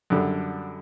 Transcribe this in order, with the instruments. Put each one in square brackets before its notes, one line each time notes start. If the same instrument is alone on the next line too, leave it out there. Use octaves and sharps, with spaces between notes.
[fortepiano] F#2 D3 G3